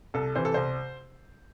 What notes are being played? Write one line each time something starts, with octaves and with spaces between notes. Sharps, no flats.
C2 A4
C3 E3 C5
A4
C2 C5